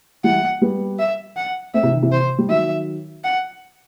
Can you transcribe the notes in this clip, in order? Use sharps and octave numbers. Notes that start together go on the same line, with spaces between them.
E3 G3 F#5
G3 B3
E5
F#5
A3 C4 E5
C3 E3
D#3
C3 E3
C5
G3
D#3 F#3 E5
F#5